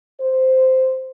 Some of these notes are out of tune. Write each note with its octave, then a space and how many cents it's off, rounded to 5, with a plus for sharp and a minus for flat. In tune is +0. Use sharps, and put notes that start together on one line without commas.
C5 -10